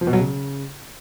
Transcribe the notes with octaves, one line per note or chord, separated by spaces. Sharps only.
F3
B2
F#3
C#3